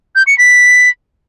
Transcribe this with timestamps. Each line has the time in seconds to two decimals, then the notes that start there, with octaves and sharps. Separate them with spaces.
0.16 G6
0.27 C#7
0.38 B6